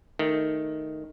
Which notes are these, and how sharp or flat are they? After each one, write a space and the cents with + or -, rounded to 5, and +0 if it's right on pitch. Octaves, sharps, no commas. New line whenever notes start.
D#3 +0 A3 +0